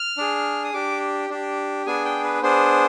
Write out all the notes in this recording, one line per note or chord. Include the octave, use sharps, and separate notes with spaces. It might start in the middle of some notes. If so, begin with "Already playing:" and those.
Already playing: F6
D4 G#4
D#6
D4 G4 D6
D4 G4
B3 D4 G#4 G#5
G5
B4
B3 D4 G#4 C5